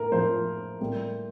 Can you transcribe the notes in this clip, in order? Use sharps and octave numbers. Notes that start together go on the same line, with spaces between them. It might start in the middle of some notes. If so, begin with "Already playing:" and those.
Already playing: A2 A#3 A#4
A2 F3 A#3 C5
A2 G3 A#3